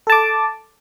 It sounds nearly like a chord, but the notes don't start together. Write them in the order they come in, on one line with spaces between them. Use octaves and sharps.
A4 A5 D6